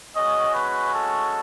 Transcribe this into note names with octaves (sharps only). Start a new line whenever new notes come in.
G#3 C#4 F#4 D#5
B4
A4